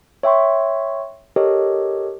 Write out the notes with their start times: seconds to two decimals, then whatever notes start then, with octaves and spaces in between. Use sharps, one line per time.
0.23 C#5 E5 G5 C6 C#6
1.36 G4 A4 A#4 C#5 D#5